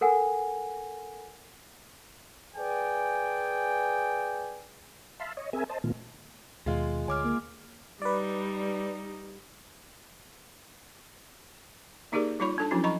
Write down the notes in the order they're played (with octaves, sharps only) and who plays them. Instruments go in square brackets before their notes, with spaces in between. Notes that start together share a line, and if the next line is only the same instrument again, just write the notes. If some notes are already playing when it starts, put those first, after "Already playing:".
[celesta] A4 A#4 F#5 G#5
[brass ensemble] G#4 B4 D5 G5 G#5
[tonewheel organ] E5 F5 A5 B5 C6
C#5 D#5
C4 G#4 A#4 E5 G#5
C5 D#5 A5
A#2 D#3 A3 B3 F4
[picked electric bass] D#2 [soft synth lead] B2 [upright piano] G#3 F4
[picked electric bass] D2 [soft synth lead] C#5 [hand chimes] G#5 D6 F6
[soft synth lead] A#3
[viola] G3 D#4 [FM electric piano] B4 D5
[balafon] A#3 D#4 G4 G#4 A#4 D5
G3 D#4 F4 C#5 B5 C#6
D4 A4 A5
F3 F#3 C#4 D4 E4 F#4
D#5 A#5 B5 C#6